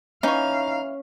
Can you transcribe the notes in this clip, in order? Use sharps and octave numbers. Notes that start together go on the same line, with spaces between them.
E3 C#4 D#4 C#5 F5